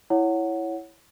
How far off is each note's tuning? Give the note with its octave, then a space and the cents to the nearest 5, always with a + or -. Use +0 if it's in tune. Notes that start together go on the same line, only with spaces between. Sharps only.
E4 +0 C#5 +0 F#5 +0